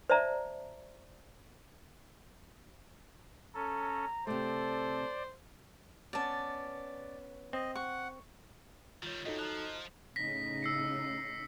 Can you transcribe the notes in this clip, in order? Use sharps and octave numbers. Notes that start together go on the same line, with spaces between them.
C5 D5 E5 A5 A#5
C#4 A4 A#5
C3 A3 A4 C5 D5
B3 C#4 D5 A5
C4 D#5
F#5 C#6
D#3 G3 F4 C#5
G2 D#4 F#4 A4 D#5
F3 D#5 A5 A#5 F#6
A2 C#3 D#4 A#6 B6
E6 C7 C#7